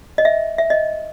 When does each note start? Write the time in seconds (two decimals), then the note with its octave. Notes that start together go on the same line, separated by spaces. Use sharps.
0.18 D#5
0.25 E5
0.58 E5
0.70 D#5